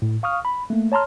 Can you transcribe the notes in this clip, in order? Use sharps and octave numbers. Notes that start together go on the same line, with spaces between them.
A2
F5 C#6 D#6 F6
B5
A3 A#3
C#5 A5 A#5 C6 F6